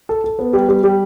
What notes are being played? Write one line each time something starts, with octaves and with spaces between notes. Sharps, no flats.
A4
A4
B3
G3
G3
G3